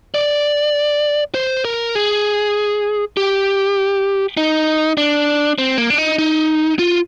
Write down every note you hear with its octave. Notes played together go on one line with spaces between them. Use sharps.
D5
C5
A#4
G#4
G4
D#4
D4
C4
A#3
D4
D#4
D#4
F4